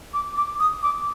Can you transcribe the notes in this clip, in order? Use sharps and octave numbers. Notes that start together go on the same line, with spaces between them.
D6
D6
D#6
D6